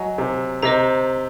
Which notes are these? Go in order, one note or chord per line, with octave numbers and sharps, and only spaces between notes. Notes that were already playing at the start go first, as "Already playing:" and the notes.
Already playing: F#3 D#5 G#5
C3
C3 C5 D#5 A#5